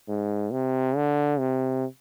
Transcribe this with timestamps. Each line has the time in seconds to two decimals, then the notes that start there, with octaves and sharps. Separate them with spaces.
0.08 G#2
0.52 C3
0.96 D3
1.39 C3